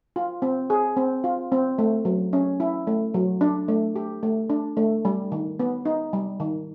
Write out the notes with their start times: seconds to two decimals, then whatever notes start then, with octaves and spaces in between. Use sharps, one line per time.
0.16 F4
0.42 C4
0.70 G#4
0.97 C4
1.24 F4
1.52 C4
1.78 A3
2.05 F#3
2.33 C#4
2.60 E4
2.87 A3
3.14 F#3
3.41 D4
3.68 A3
3.96 G4
4.23 A3
4.50 D4
4.77 A3
5.05 G3
5.32 D#3
5.60 B3
5.85 D#4
6.13 G3
6.40 D#3